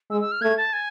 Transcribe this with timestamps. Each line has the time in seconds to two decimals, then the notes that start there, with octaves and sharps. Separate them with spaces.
0.10 G#3 E6
0.21 E6
0.32 F6
0.42 A3 G#6
0.57 A5
0.73 G#5